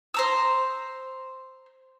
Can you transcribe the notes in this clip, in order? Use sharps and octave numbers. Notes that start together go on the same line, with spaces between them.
C5 A#5 E6